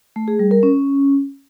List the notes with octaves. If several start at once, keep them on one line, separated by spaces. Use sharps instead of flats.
A3
G#4
G3
A#4
C#4